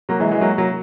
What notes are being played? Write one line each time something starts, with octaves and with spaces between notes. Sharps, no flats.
F#3 A#3
E3 G#3
E3 G#3
F#3 A#3
F#3 A#3